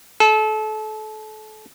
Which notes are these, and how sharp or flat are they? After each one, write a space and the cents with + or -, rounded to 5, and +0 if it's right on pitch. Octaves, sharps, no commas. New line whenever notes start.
A4 -30